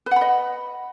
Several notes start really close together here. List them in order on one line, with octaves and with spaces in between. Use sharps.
B4 F#5 B5 D#5